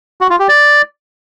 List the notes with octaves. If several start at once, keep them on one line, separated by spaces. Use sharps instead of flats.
F#4
F4
G4
D5